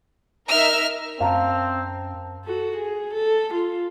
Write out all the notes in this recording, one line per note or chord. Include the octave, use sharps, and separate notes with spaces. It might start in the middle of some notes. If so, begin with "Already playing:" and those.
D#4 A#4 E5 F6
F#2 C4 F5 A5 A#5
F#4 A4
G#4
A4
F4